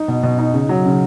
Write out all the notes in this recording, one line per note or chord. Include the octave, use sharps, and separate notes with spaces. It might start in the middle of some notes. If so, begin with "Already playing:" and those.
Already playing: D#4
B2
B2
D#4
C#3
F#3
C#3